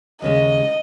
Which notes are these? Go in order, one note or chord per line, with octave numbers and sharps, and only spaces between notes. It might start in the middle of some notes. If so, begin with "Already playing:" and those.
D#2 C#3 G#3 D#5